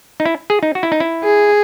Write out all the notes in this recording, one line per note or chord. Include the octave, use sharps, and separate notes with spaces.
D#4
E4
G#4
D#4
F#4
E4
D#4
E4
G#4